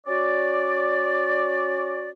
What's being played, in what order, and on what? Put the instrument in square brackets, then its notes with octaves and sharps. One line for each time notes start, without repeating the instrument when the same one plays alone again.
[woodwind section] C#4 F#4 D5